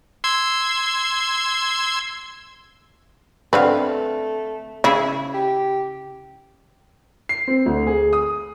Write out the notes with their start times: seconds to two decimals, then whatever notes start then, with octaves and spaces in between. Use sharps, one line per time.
0.24 C6 E6 G#6
3.53 D3 A3 C4 B4 F5
4.84 C#3 E4 G#4 E5
5.34 G4
7.29 C7
7.48 C4
7.66 D2
7.87 G#4
8.13 D#6